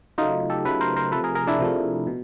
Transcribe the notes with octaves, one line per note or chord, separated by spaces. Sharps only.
C#3 F#3 A3 D#4 F4
G4 A4
C#3 F#3 A3 A4 B4
A#4 C5
A#4 C5
C3 F3 A3 A4 B4
G#4 A#4
G#4 A#4
D4 E4
C3 F3 A3
B2